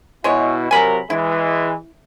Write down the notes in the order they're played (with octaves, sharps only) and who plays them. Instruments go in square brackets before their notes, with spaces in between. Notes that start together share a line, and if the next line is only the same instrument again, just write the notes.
[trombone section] B2 E4 [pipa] G#3 C#5
[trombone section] C3 F#3 A#4 [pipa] G#5 B5
[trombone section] E3 G#3 [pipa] E4